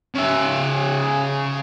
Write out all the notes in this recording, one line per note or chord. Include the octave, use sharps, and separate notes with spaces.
C#3 E5